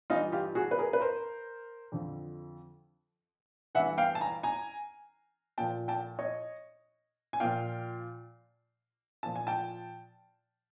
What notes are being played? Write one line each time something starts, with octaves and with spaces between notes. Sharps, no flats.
G2 E3 D#4 F4
F4 G4
F#4 G#4
B4
G#4 A#4
B4
A#4 C5
F2 D3 F3
G2 E3 E5 F#5
F5 G5
A5
G#5 A#5
G#5 A#5
A#2 F3 G5 A5
G5 A5
C#5 D#5
G#5
A#2 F3 F5 G5
A#2 F3 A5
G#5
G5 A5